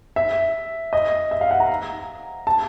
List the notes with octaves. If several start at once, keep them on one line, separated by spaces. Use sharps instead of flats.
E5
D#5
E5
F5
F#5
A#5
A5